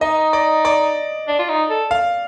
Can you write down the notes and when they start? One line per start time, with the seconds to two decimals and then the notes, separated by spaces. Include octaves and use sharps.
0.01 D#4 D#5
0.33 D5
0.65 D5
1.28 D4
1.39 F4
1.49 D#4
1.70 A4
1.91 F5